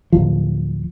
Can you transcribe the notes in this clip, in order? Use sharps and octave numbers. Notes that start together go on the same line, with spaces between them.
D1 G#1 F3